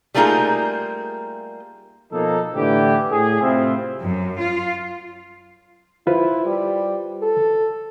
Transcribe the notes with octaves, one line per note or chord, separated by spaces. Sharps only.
G3 A3 A#3 D#4 F4 G#4
B2 F3 A#3 D#4 A4
A2 D3 E3 G4
A2 G#4
A2 C3 C4 E4 F4
F#2
F4
E4 F4 B4 C5
G3
A4